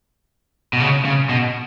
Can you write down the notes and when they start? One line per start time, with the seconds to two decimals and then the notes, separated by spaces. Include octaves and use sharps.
0.73 B2
0.80 C#3
1.05 C#3
1.29 B2